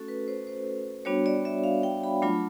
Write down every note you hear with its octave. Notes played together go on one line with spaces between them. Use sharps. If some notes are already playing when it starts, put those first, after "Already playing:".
Already playing: A3 C#4 F#4 A4
B4
C5
C5
G3 B3 D4 F#4 C#5
D5
E5
F5
G5
B5
F#3 A3 D4 F4 B5